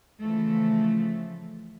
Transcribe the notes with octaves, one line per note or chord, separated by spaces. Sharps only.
C#3 E3 F3 A3